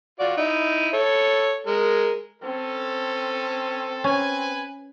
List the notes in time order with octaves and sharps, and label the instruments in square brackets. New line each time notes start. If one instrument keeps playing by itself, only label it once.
[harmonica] F4 F#4 D5
D#4 E4
A4 C#5
G#3 A#4
[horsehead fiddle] C4 [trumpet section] C#4 A4
[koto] C#4 [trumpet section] B4 G#5